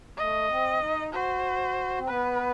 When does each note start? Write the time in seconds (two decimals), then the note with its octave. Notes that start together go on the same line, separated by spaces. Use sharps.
0.17 A3 D#5
0.50 C4
0.81 D#4
1.13 F#4 C5
1.98 C4
2.08 B3 B4